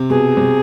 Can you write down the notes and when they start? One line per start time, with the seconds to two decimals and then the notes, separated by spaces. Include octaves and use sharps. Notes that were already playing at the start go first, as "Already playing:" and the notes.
Already playing: C3
0.10 B2 G#4
0.37 C3